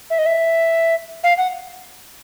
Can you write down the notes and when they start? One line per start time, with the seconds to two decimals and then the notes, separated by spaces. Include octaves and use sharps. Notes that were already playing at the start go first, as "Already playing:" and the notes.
0.10 E5
0.19 D#5
0.26 E5
1.24 F5
1.38 F#5